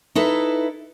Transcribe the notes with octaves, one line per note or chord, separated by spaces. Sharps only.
D#4 E4 A4 B4